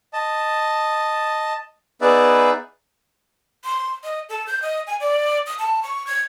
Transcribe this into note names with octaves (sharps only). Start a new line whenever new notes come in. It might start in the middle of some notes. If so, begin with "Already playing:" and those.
D#5 A5
B3 D#4 G#4 B4 D5 E5
C6
D#5
A4
G6
D#5
G#5
D5
D#6
A5
C#6
G#6